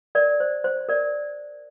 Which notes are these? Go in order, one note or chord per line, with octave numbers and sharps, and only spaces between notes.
A#4 D5
C5
C5
A#4 D5